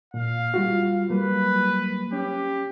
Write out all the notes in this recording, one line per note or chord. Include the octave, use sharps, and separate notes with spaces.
A#2 F5
G3 F4 F#4
F#3 G3 A#3 B4
C#4 G4